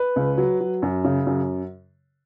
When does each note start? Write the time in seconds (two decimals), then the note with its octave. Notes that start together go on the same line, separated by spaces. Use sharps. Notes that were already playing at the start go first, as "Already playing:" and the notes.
Already playing: B4
0.16 C#2
0.38 F#3
0.60 F#3
0.82 F#2
1.04 C#3
1.26 F#2